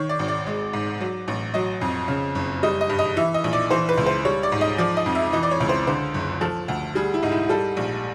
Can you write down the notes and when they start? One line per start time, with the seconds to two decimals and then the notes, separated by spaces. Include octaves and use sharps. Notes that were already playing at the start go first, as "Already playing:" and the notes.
Already playing: D#3 C#5
0.09 D5
0.19 G#1
0.28 D5
0.47 G#3
0.73 G#2
1.00 F#3
1.28 A1
1.54 F#3 D#5
1.81 F2
2.08 C#3
2.35 F#1
2.63 G3 D#5
2.81 D#5
2.89 G2
2.99 D#5
3.17 E3 E5
3.34 D#5
3.44 A#1
3.53 D5
3.71 E3 C5
3.89 B4
3.98 C#2
4.06 C5
4.25 G3 C#5
4.43 D5
4.52 G#2
4.61 D#5
4.78 F3 D5
4.97 D#5
5.06 F2
5.15 E5
5.33 E3 D#5
5.43 D5
5.51 C#5
5.60 C#2
5.69 C5
5.87 D3 C5
6.14 F#1
6.41 F3 A4
6.68 D2
6.95 G3 G#4
7.14 E4
7.22 G#2 D#4
7.31 E4
7.49 G3 A4
7.77 A#1